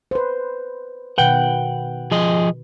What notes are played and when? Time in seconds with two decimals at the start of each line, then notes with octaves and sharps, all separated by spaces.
0.11 B4 C5
1.18 B2 D#3 B4 F#5 G5
2.11 F3 G#4 D#5